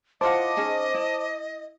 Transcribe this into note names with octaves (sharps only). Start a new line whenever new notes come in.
E4 F4 C5 D#5 F#5 A5 D6
C#4 D#4 G#4
E4